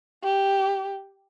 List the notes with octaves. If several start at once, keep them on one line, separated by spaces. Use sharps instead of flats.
G4